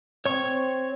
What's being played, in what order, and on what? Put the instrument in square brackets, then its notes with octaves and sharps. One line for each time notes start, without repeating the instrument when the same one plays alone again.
[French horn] C4 [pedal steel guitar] C#5 C#6